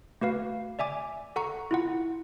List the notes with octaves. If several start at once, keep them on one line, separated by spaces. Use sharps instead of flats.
A3 F#4 B4 F5
D5 E5 G#5 D6
A4 F#5 A#5 C#6
E4 F4 F#5